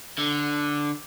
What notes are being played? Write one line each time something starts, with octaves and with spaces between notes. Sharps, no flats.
D3